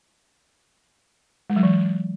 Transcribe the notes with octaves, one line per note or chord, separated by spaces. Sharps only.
G#3
F#3
E3